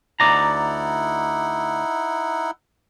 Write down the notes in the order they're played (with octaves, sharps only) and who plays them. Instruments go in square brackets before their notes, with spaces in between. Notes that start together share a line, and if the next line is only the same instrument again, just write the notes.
[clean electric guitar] D2 D5 A#5 [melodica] D#4 E4 F#5